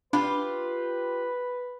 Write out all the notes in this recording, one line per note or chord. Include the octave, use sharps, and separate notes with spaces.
D4 F4 G4 B4 B5